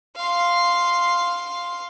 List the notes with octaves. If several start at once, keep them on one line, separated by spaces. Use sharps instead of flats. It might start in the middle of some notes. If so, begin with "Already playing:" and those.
F5 C6